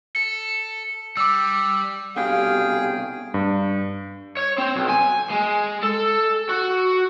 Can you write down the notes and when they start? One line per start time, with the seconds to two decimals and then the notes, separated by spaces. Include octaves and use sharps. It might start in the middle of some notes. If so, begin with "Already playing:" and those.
0.16 A4
1.17 G3 D6 E6
2.16 C2 B2 D3 G4 G#4 F5 G5
3.34 G2
4.37 C#5
4.58 C4
4.76 B1
4.90 G#5
5.31 G#3
5.83 A4
6.49 F#4